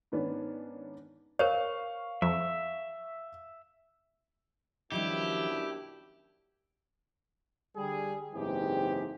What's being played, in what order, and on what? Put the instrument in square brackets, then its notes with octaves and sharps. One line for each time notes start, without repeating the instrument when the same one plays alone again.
[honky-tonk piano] G#2 D#3 B3 C#4 D4
[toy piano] A#4 C5 C#5 [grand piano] F5 C#6
[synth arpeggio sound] F2 [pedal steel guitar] E5
[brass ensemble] F#2 B2 D4 [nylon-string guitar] D#3 F3 G3 [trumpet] E4 [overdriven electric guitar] G4
[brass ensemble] D3 G3 G#4
F#1 G#2 E3 C4 G4